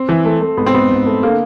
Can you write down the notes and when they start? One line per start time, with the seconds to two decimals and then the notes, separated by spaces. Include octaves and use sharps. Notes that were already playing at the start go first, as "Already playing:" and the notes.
Already playing: C4
0.09 E3
0.25 A3
0.41 A3
0.57 G#2 B3
0.66 C4
0.74 G#2 B3
0.91 G#2
1.06 A3
1.23 D3 A#3